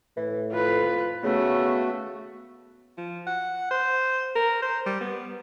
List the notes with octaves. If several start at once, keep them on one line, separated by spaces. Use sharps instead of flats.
A2 E3
F2 F4 B4
C#3 A3 B3 F#4
F3
F#5
C5
A#4
C5
G3
B3